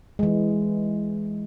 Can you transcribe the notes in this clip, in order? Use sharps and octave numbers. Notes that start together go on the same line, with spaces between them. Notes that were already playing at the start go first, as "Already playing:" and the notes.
E3 G#3